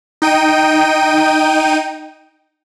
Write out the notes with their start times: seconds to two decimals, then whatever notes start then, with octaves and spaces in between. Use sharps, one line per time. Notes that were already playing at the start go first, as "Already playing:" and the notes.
0.22 D#4 G5 D#7